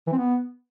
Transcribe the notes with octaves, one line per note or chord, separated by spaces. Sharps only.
E3
C4
B3